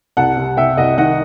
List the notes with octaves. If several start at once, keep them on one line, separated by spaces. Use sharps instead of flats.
C2 F#5 A5
C3
C2 E5 G5
C2 D#5 F#5
D#3 D#5 F#5